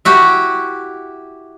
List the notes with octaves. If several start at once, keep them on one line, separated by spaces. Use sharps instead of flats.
E4 F#4 G4